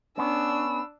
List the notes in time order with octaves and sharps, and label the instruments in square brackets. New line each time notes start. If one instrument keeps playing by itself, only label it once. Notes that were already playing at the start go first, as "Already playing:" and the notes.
[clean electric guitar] B3 C#4 [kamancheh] D4 E6